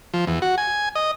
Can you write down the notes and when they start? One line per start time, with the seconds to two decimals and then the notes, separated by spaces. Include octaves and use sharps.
0.14 F3
0.27 E2
0.42 F#4
0.58 G#5
0.96 D#5